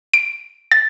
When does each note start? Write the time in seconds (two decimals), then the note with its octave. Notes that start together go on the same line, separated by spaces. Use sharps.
0.14 D7
0.72 A6